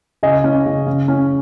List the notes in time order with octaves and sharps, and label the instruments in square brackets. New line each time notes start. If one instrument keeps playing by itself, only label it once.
[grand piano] C#3 D#5 G#5
C#4
C#3
C#3
C#4